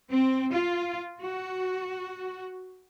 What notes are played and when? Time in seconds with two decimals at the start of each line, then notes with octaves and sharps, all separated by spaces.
0.11 C4
0.53 F4
1.20 F#4